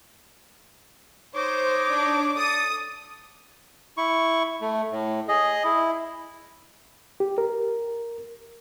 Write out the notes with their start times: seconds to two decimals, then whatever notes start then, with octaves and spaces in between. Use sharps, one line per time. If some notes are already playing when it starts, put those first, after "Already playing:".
1.36 D#4 C5 C#5 D6
1.90 D4
2.37 A4 D#6
3.97 E4 C#6
4.61 A3
4.92 A2
5.28 G#4 D#5
5.64 E4
7.20 G4
7.38 A#4